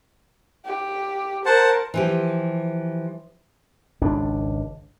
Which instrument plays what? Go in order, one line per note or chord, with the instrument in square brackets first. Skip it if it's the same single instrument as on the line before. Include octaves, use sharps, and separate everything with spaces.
[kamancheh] G4
[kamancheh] A#4 [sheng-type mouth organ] C5 F#5 A5
[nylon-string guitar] E3 F3 G4
[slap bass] G#1 C#2 D4